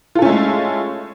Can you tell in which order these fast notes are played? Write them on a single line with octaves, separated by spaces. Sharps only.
F4 A4 C#4 A3 G#3